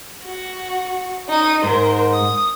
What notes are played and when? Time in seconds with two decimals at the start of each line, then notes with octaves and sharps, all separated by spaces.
0.24 F#4
1.28 D#4 D#7
1.64 G#2 A#4 C5
2.13 D#6